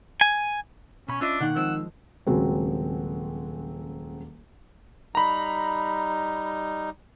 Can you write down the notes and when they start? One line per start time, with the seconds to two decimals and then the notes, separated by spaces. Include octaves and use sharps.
0.21 G#5
1.08 B2 C#4 B5
1.21 C#4 D4 F4 D#5 E5
1.40 B2 D#3 A#3 F#5
1.56 F3 G#3 C4 E6
2.27 D#1 C#3 F#3 G#3 C4
5.15 G3 D#4 A#5 B5